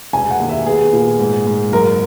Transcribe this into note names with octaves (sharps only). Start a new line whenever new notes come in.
E1 G#5
F#5
D#2
E5
B3 G#4
A#2
G#2
G#2
F#1 A#4